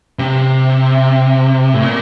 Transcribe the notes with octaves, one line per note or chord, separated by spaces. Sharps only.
C3
A2
A#2